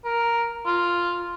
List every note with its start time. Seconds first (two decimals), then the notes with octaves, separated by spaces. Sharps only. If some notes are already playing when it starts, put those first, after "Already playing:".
0.05 A#4
0.66 F4